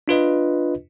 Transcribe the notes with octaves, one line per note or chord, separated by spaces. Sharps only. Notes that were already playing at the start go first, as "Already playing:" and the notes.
D4 F4 B4 D#5